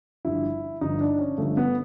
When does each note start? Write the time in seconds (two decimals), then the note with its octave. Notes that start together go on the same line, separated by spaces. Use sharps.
0.25 G1 G2 D3 F3 E4
0.81 G1 G2 D3 F3 D#4
1.00 D4
1.19 C#4
1.38 G1 G2 D3 F3 A3
1.57 B3